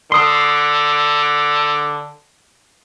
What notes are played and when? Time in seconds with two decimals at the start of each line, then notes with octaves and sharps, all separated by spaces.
0.12 D3 C6 D#6